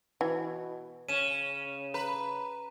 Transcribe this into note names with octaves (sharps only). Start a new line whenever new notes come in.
B2 E3
C#3 C#4 D#7 E7
B4 A#5